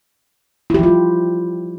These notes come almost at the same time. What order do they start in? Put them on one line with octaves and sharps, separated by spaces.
E4 G4 F3 F4 G3